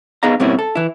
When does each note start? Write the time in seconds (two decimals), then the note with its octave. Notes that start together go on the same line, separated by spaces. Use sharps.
0.23 B3 D#4 G#4 D#5 F5 A#5
0.40 G2 B2 A#3 C4 C#4 E4
0.59 A4
0.75 E3 E4